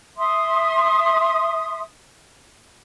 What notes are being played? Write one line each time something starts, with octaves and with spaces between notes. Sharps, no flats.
E5 C6 D#6